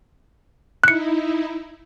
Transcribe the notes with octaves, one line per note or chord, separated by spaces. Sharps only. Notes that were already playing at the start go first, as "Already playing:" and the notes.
D#4 E4 F#6 C#7